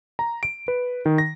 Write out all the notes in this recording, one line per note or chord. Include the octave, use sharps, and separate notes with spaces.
A#5
D7
B4
D#3
A#6